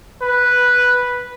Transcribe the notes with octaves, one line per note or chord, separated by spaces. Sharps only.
B4